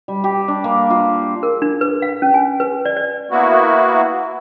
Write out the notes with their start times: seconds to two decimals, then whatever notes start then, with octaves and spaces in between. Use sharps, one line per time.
0.08 G3
0.24 G4
0.48 D4
0.64 A#3
0.90 F4
1.43 A#4
1.62 D4
1.81 B4
2.02 F5
2.22 C#4
2.34 G#5
2.60 B4
2.85 D5
2.97 D5
3.31 A#3 B3 E4 F#4